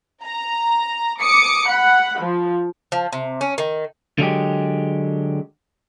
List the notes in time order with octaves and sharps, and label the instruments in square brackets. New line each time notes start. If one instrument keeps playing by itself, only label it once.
[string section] A#5
D6 D#6 C#7
F#5 B5
F3
[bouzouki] F3
C3
C#4
D#3
[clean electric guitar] D3 F#3 G#3 G4